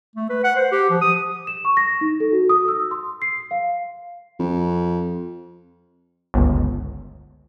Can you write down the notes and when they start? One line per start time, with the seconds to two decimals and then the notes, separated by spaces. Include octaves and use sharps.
0.16 A3
0.30 B4
0.44 F#5
0.56 C5
0.72 G4
0.90 F3
1.02 D#6
1.47 E7
1.65 C#6
1.77 A#6
2.01 D#4
2.20 A4
2.32 F#4
2.49 D#6
2.68 E6
2.91 C6
3.22 C7
3.51 F5
4.40 F2
6.34 G1 C#2